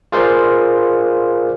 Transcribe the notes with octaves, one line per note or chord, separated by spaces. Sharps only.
F4 G#4 A#4 C5 D5 F5